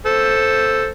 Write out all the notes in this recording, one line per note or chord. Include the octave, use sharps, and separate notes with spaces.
A4 C5